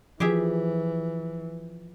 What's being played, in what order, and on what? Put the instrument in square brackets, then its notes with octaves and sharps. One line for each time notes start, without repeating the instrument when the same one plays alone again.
[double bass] E3 [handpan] F3 [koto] G4 G#4 E5